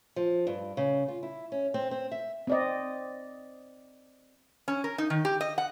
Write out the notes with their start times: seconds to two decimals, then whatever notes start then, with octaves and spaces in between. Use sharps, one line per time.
0.16 F3
0.47 G2
0.77 C#3
1.08 F4
1.23 E4
1.52 C#4
1.74 C4
1.91 C4
2.11 E5
2.47 C4 D5 D#5
4.68 C#4
4.84 A#4
4.98 D#4
5.10 D#3
5.25 G4
5.41 D#5
5.58 F#5